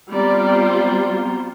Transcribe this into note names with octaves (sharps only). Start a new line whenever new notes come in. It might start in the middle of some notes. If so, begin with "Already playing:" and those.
G3 B3 C4 F4 C5 D5 A#5